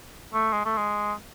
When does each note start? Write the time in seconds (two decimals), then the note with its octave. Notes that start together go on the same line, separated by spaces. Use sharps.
0.33 A3
0.52 G#3
0.65 A3
0.77 G#3